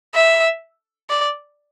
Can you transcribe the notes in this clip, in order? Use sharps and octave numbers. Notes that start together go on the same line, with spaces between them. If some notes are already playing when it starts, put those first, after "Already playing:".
E5
D5